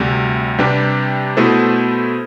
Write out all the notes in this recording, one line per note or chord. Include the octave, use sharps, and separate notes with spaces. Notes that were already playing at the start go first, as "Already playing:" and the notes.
Already playing: D2 C3 G3
C3 G3 D4 G4 B4
B2 A3 E4 A4 C5